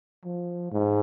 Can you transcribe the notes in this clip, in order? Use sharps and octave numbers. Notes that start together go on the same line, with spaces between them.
F3
G#2